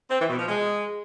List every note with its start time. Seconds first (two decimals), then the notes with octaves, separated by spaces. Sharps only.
0.10 C4
0.20 E3
0.29 B2
0.39 F3
0.48 G#3